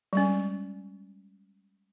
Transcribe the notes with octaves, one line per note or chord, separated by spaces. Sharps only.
G3 G#3 C#4